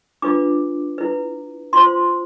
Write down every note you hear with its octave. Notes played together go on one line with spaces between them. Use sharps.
D4 F4 B4 D6
E4 B4
F4 C5 C6